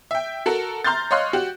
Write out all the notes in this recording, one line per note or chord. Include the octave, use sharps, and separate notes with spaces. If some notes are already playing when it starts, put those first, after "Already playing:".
E5 G5
F#4 A4 A#4
A#5 C6 F6 G6 A6
C#5 D#5 F5 C6 F6 F#6
F#4 G4